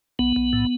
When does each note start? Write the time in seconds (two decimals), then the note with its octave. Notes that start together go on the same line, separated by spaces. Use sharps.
0.19 B1 B3
0.36 B1
0.53 A2